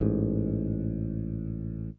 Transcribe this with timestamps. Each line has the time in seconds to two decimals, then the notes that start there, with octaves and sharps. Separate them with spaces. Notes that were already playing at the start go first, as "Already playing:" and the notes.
0.01 A1 G#2